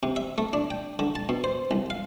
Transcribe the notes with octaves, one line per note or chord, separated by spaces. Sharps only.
C3
E5
A3
D4
G5
D3
A5
B2
C5
C2
F5